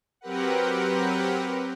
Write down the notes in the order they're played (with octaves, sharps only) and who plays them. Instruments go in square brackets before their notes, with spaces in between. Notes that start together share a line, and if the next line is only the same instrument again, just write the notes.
[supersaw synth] F#3 C4 G4 A#4 B4 F#5